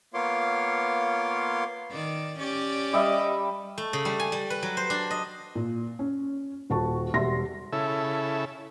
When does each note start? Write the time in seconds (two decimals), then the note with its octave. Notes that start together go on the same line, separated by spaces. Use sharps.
0.14 A#3 B3 F4 C#5 C6 D6
1.90 D#3 D5
2.38 C#4 G4 D5
2.93 G3 D#5 E5
3.78 A3
3.93 C#3
4.05 G3
4.20 G#5
4.32 G3
4.50 B4
4.63 F#3
4.77 C5
4.90 D4
5.11 D#5
5.55 A#2
5.99 C#4
6.70 D#1 F#4 A5 C#6
7.14 E1 G3 E5 C6 A#6
7.72 C#3 E4 A4